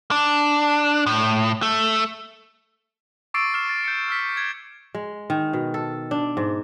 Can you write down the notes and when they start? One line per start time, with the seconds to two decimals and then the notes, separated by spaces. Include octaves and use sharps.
0.11 D4
1.06 A2
1.62 A3
3.34 C#6 D6 E6 A6 C7 D7
3.54 C#6 F6 C7 E7
3.69 A6
3.84 G6 C#7
4.08 E6 F6 B6
4.37 G#6
4.95 G#3
5.30 D#3
5.53 B2
5.74 A4
6.11 D4
6.37 G#2